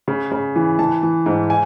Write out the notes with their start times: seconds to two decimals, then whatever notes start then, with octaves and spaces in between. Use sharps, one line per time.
0.08 C#3
0.31 C#3
0.56 E3
0.79 E3 A5
1.03 E3
1.26 G#2
1.50 G#5